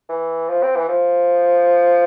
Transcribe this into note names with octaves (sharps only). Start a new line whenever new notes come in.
E3
F3
C4
E3
F3